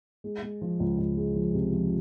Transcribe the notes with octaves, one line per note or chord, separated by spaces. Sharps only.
G#3
G#3
F3
C#2
C#2
G#3
F3
C3
F3